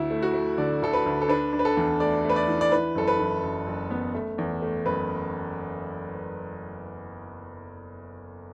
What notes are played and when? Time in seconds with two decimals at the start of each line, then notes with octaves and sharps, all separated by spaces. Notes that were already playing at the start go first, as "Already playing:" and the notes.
Already playing: D2 E4
0.10 A3
0.22 F#4
0.34 A3
0.58 D3 D5
0.82 D2 A4
0.93 B4
1.06 D2
1.22 A4
1.29 D4 B4
1.53 D4
1.59 B4
1.65 A4
1.77 E2
2.00 A3 D5
2.25 A3 B4
2.36 D5
2.48 E3
2.61 D5
2.72 E3 B4
2.95 F#1 A4
3.08 B4
3.19 E3
3.43 F#1
3.67 F#1
3.90 B3
4.14 A3
4.38 E2
4.62 A3
4.86 F#1 B4